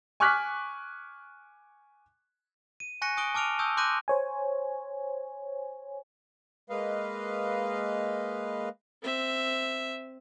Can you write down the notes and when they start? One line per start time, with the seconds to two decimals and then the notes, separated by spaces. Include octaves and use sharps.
0.20 G#5 C#6 D6 F6 F#6 B6
2.80 D#7
3.02 G#5 C#6 F#6 A#6 C#7 D#7
3.17 G#5 C#6 D#6 F#6 D7 G7
3.35 A5 D6 F6 D7 F7
3.59 A5 C#6 D#6 E6 G6
3.77 C6 D6 F#6 G6 A#6 D#7
4.08 C5 C#5 G#5
6.70 G#3 A#3 B4 D#5 F5
9.03 C4 E5